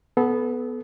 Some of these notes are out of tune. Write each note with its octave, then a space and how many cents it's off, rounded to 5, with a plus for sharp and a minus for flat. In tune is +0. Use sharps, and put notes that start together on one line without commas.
B3 +0 A4 -35